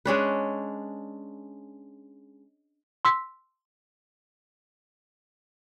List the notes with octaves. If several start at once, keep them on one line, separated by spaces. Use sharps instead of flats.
G#3 C#4 D4 B4
C6 E6 B6